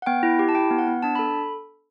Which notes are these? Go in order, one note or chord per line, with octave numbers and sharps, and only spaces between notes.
F#5
B3 G5
E4
G4
A5
E4 G5
B3
F#5
B3
D4 A5
A4 B5